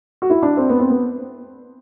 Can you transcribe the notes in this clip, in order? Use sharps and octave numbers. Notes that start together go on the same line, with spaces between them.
F#4
E4
D4
C4
B3
C4
B3